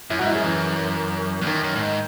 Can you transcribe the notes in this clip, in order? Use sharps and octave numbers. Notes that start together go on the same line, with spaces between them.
F#2 E4
G#2 F#4
E4
F#2 G#3
E3
E2
F#2 D#3
F#2
A2
G#2